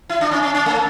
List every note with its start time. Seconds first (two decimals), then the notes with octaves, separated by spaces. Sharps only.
0.09 E4
0.21 D4
0.31 C#4
0.43 C#4
0.55 C#4
0.66 A3